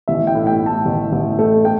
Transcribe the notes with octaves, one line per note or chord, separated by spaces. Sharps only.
A1 E5
G5
A2
G5
A2
A5
A1
A1
A3
A3 G5